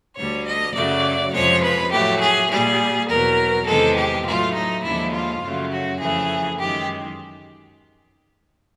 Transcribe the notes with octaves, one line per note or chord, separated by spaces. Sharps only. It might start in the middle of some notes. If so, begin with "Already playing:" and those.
D2 D3 G3 C#5
D#5
F#2 C#3 F#3 A3 D5
F2 C3 F3 G#3 C#5
B4
A2 F#3 A3 G4
G#4
A#2 G3 G#4
E2 B2 F#3 A#4
E2 C3 D#3 G#3 A4
G4
A2 F#3 A3 F4
D#4
D#2 D3 F3 G#3 E4
F4
F#2 C#3 F#3 A3
F#4
F2 C#3 E3 A3 G#4
F#2 D#3 G#3 G4